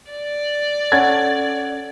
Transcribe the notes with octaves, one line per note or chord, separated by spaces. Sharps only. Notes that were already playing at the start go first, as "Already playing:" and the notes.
D5
C#4 A4 F#5 G#6 A6